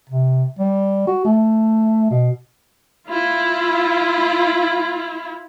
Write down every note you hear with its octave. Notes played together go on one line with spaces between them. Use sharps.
C3
G3
F#4
A3
B2
E4 F4